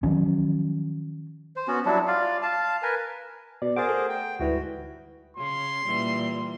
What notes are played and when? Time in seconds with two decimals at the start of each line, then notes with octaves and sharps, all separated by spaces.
0.03 D#3 F3 F#3 C#4
1.56 C5
1.68 B3 C#4 F#4
1.86 F#3 G3 D4 E4
2.07 F4 D5 F5
2.42 F5 A5
2.83 A#4 B4 G#5
3.62 B2 D5
3.76 G#4 A#4 C5 F#5 D6 A6
3.89 A3
4.09 G5
4.40 D2 G#2 E3 G3 E4 F#4 B4
5.37 C#3 C#4 C6
5.86 A#2 E3 G3